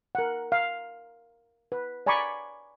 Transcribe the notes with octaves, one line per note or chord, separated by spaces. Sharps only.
A#4 F#5
F5
B4
D5 G#5 A#5 B5 C#6 D6